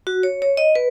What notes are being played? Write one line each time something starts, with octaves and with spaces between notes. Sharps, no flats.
F#4
C#5
C#5
D#5
B4